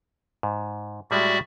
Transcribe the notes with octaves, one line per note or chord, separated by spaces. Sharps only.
G#2
A2 G3 G#3 F#4 D5 E5